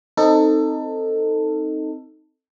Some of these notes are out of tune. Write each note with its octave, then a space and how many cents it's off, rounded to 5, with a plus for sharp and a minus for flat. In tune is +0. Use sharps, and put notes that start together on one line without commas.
C4 +0 D#4 +0 A4 +20